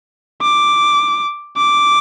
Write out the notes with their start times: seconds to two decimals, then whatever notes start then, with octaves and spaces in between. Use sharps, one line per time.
0.42 D6
1.57 D6